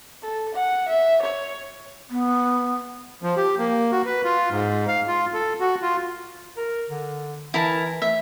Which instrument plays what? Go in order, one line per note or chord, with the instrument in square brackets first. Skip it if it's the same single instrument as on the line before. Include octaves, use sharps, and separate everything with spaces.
[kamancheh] A4
F#5
E5
C#5
[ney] B3
[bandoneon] F3
G4
A#3
F#4
B4
F4
G#2
F5
F4
A4
F#4
F4
[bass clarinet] A#4
D3
[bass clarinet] E3 [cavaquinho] E4 A#4 A5
[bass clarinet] A3 [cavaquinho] E5